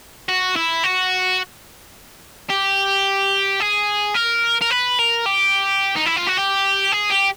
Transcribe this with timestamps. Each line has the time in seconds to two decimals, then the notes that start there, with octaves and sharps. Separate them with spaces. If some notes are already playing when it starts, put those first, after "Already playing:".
0.28 F#4
0.56 E4
0.84 F#4
2.50 G4
3.60 G#4
4.15 A#4
4.62 A#4
4.71 B4
4.99 A#4
5.26 G4
5.96 D#4
6.06 E4
6.16 F4
6.27 F#4
6.37 G4
6.92 G#4
7.10 G4